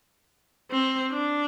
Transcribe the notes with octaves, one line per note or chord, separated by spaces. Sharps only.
C4
D4